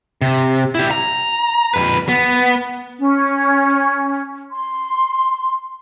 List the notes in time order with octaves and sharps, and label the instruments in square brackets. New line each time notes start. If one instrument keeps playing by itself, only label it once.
[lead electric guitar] C3
E4 G4
A#5
F2 B4
B3
[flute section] C#4
C6